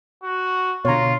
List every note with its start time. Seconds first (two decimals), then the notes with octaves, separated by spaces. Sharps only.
0.24 F#4
0.85 B2 D3 F4 C#5 A#5